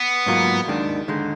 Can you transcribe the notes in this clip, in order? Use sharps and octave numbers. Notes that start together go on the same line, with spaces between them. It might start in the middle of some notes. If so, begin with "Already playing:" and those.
Already playing: B3
G#2 F#3 A#3 F4
D#2 D#3 G#3 D4
D#2 D3 G#3 D#4